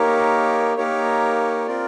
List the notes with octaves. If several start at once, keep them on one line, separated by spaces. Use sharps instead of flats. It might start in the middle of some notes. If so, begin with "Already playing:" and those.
Already playing: A#3 D#4 G4 A#4 C#5
A#3 D#4 G4 A#4 C#5
C4 F4 A#4 D5